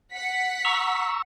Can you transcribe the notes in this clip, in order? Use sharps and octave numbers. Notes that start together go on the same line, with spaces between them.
F#5 B6
A#5 C#6 E6